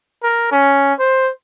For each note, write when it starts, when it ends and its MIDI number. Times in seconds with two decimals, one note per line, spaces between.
0.23 0.49 70
0.52 0.93 61
0.99 1.31 72